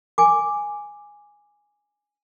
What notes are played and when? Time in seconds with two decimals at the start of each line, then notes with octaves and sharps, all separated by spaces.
0.18 G#5 D6